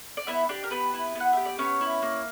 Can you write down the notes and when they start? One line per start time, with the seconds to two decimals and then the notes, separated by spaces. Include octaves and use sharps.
0.17 D5
0.27 B3 E4 E5
0.49 D4 G4 D5
0.64 A#4
0.71 B3 B4
0.94 E4
1.15 B3 F#5
1.33 G4 E5
1.45 D5
1.59 B3 C#4 C#5
1.81 E4
2.02 A#3